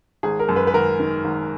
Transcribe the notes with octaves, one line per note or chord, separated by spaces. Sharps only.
G#1 G#4
A#4
F#2
B4
B4
G#1 A#4
D#3
G#1